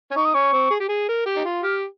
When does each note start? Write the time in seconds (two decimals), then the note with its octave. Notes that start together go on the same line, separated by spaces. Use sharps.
0.11 C#4
0.16 D#4 C#6
0.25 D#6
0.34 C#4 C#6
0.53 C4
0.71 G#4
0.80 G4
0.89 G#4
1.09 A#4
1.26 G4
1.36 D#4
1.45 F4
1.62 G4 F6